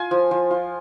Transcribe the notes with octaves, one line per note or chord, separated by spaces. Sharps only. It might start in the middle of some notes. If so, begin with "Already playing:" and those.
Already playing: F4 G#5
F3
F3
F4